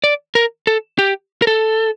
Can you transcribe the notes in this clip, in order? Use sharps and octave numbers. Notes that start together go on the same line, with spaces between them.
D5
A#4
A4
G4
A#4
A4